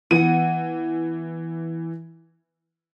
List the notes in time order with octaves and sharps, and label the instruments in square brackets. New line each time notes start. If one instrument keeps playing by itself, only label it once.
[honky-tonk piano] E3 D#7 [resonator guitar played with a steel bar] B3 F#5